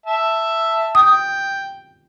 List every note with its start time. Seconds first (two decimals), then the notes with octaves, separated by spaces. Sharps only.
0.06 E5 A5
0.95 G5 D#6